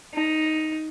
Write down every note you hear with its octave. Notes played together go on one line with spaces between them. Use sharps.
D#4